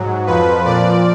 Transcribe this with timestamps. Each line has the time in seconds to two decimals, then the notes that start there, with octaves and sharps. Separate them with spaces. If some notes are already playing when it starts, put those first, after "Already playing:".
Already playing: G#2 F#3
0.26 F2 F3 B4
0.64 A#2 F3 D5